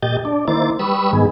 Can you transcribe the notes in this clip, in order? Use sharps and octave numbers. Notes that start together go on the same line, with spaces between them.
A#2 G4 D#5 G6 A6
D4 D5
D#3 A#3 E4 C5 D6 A6
G3 B4 B5 C#6 D#6 E6
G#2 D#3 B3 G#4